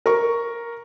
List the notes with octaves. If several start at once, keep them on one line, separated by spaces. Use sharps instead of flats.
A#4 C#6